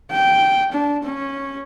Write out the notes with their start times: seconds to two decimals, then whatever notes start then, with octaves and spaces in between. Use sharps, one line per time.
0.11 G5
0.72 D4
1.03 C#4